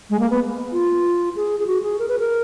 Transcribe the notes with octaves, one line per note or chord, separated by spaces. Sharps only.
G#3
A#3
B3
F4
G#4
G#4
F#4
G#4
A#4
B4
A#4